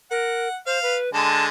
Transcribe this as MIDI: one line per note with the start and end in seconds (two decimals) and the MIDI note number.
0.11 0.48 70
0.11 0.55 78
0.66 0.81 72
0.66 0.95 77
0.83 1.12 71
1.13 1.49 50
1.13 1.49 56
1.13 1.44 81